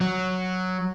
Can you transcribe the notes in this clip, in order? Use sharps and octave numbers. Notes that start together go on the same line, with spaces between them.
F#3